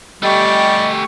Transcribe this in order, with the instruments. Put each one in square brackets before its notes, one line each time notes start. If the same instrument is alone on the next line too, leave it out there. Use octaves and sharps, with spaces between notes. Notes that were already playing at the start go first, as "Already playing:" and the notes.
[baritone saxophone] G3 [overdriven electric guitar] A3 G4 [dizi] D#5 [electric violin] C#6